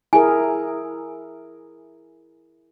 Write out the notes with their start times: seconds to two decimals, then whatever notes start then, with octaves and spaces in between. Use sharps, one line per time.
0.13 E4 G#4 A#4 G#5